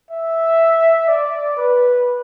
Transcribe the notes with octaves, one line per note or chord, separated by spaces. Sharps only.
E5
D5
B4